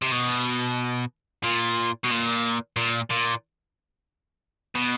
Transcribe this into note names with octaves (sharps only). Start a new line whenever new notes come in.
C3
B2
A#2
B2
A#2
A#2
A#2
B2